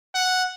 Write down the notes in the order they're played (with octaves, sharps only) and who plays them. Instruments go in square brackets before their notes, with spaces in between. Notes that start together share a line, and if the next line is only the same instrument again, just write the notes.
[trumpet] F#5